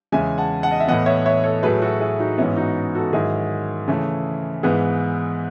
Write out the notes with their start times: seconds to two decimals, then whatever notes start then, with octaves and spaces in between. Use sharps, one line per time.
0.12 E2 C#3 G#3 E5 G#5
0.38 F#5 A5
0.63 F#5 A5
0.71 D#5
0.80 E5
0.87 A2 E3 B3 D#5 F#5
1.06 C#5 E5
1.25 C#5 E5
1.44 A4 C#5
1.62 A2 F#3 A3 G#4 B4
1.82 F#4 A4
2.00 E4 G#4
2.19 D#4 F#4
2.37 G#2 E3 B3 C#4 E4
2.56 D#4 F#4
2.95 F#4 A4
3.13 G#2 D#3 F#3 E4 G#4
3.88 C#3 E3 A3
4.63 G#2 E3 B3 G#4 B4